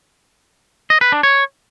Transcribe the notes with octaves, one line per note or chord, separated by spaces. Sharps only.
D#5
B4
D4
C#5